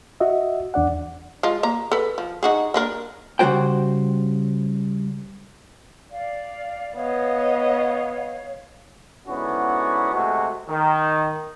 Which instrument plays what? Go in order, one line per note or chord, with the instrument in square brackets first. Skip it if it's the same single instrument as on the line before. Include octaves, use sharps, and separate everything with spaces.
[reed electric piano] F#4 D#5 E5
E2 D4 D5 F#5
[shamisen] G#3 F4
A#3 A#5
A4 B4
F3
D#4 F#4 G#4
A#3 D4 A#4
[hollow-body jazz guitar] C#3 G3 F#4 C5 G5
[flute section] D5 F5
[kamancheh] B3 D#5 [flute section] C#5 F5
[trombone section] G#2 D3 B3 C#4 E4 F#4
C3 G#3 A3 F#4
D#3